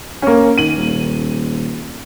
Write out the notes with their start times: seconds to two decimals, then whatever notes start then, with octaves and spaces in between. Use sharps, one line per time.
0.22 A#3 C#4
0.58 D#3 D#7 F#7
0.77 D#1